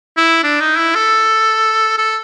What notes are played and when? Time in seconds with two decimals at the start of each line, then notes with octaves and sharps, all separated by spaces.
0.17 E4
0.44 D4
0.61 D#4
0.78 E4
0.95 A4
1.98 A4